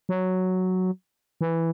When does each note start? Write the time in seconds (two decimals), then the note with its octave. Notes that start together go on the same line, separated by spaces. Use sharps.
0.09 F#3
1.41 E3